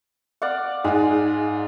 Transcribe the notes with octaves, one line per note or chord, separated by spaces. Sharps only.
D5 F5 F#5
G#2 G#3 G#4